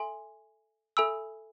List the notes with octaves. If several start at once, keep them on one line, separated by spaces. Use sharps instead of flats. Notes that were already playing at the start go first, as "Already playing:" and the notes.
Already playing: A4 E5 G#5 C6
A4 E5 G#5 B5 E6